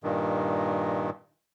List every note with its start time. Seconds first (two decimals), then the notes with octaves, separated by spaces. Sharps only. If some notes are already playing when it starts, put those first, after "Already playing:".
0.03 G2 A#2 D#3